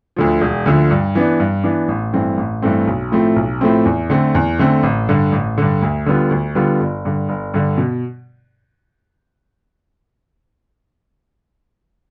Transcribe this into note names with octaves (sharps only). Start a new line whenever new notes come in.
D2 D3 F3
E1
D2 D3 F3
G2
E3 B3 D4
G2
E3 B3 D4
A1
G2 E3 A3 C4
A1
G2 E3 A3 C4
B1
A2 F3 A3 C4
B1
A2 F3 A3 C4
E2
D3 A3 C4
E2
D3 A3 C4
A1
G2 D3
A1
G2 D3
D2
D3 G3 B3 F4
D2
D3 G3 B3 F4
G1
G2 D3
G1
G2 D3
B2